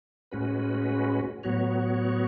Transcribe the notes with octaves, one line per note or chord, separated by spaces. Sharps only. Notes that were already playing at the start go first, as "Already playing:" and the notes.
A2 G#3 C#4 F#4 B4
A2 F#3 B3 F#4 C#5